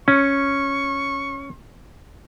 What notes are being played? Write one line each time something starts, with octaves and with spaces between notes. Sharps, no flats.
C#4 C#6